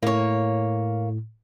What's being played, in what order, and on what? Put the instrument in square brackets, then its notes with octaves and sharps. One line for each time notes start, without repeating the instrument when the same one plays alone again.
[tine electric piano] A2 [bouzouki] A#3 C#5